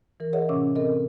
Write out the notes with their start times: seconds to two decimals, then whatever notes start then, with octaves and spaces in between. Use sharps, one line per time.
0.20 E3 A#4
0.33 G#4 A#4 C#5 D#5 E5 F#5
0.49 A2 C3 C#4 D6
0.75 C4 A4 A#4 D#5